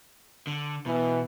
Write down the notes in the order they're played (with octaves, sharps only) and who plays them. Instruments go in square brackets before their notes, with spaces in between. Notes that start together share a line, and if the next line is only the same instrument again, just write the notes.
[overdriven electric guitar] D3
[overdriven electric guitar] B2 [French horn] E3